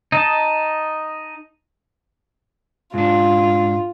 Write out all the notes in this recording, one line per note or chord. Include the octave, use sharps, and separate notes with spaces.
D#4 D#5 A5
G#2 D4 F4